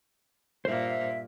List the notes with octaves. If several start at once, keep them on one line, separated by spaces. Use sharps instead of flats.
G2 A#2 A#3 C5 E5